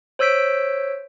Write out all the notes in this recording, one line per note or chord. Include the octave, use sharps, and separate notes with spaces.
C5 C#5 E6 G6 B6 D7